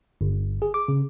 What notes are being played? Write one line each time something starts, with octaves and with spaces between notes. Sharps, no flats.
G1
G#4
D6
C#3